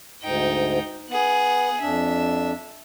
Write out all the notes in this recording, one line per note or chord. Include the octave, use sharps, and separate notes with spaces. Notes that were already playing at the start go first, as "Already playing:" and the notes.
D2 G#2 D#4 G5
B3 G#4 F#5
F2 D4 E5